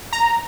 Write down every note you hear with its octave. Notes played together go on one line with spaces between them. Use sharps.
A#5